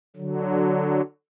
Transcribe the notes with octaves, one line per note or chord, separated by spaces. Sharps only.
D3 F#3